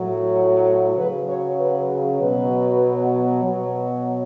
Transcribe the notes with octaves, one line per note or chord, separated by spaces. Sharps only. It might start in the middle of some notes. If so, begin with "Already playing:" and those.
Already playing: A2 F#3
C#3 F#3 B4
C#5
B4
B2 F#3 B4
B2 F#3